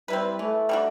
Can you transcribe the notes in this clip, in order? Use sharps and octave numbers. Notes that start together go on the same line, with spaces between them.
G3 C4 E4 B4
E3 A3
G3 D4 F#4